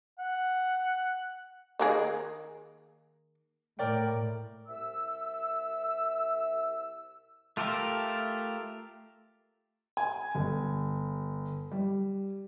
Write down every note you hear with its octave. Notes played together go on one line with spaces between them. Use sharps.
F#5
D#3 A#3 G#4
A2 A#4 D5 G5
C2 E5 E6
A3 F4 G4 A4 A#4
G#5
G1
G3